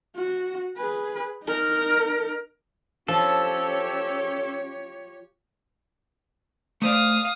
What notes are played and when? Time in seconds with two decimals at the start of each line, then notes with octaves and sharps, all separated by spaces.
0.16 F#4
0.78 G#4 B4
1.43 D#4 A#4
3.08 F3 C#4 G4 A4 C#5
6.82 A3 C5 D5 F5 D#6